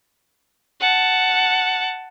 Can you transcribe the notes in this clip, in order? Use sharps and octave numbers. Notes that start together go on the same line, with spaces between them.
F#5 A5